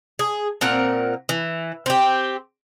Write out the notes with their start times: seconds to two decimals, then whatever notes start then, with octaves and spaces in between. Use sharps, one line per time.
0.19 G#4
0.61 A#2 C4 A#4 F#5
1.29 E3
1.86 C4 G4